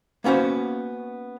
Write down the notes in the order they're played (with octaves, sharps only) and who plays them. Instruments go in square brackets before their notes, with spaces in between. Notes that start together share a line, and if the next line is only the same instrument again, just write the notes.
[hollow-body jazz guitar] A#3 B3 C#4 F#4 C5